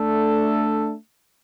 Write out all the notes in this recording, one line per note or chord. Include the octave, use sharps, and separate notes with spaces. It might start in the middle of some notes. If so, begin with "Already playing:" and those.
Already playing: A3 D4 A4